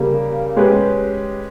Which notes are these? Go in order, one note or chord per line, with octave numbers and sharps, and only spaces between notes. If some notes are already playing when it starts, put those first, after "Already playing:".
Already playing: C#3 G3 A#3
G#3 C#4 G4 B4